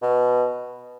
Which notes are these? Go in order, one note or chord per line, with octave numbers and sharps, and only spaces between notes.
B2